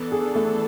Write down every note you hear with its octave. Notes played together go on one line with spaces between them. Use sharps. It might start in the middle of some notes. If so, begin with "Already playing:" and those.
Already playing: E3 B3 D4 A4
G#4
A3